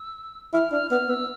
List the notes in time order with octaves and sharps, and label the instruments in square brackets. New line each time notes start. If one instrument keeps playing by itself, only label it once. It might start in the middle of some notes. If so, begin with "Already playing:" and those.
Already playing: [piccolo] E6
[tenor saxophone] E4 [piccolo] F6
[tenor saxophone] D4 [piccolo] F6
[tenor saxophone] B3 [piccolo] F6
[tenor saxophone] B3 [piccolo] E6